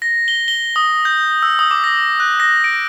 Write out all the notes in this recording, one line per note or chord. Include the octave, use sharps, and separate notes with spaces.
A#6
G7
G7
D#6
G6
E6
D#6
D6
A#6
F#6
A#6
D7